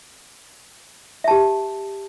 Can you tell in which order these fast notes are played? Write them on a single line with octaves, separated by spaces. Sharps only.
E5 A5 G4